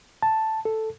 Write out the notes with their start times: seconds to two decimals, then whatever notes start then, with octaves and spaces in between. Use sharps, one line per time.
0.22 A5
0.65 A4